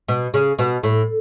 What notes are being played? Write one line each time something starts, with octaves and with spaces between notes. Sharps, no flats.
B2
C#3
B2
A2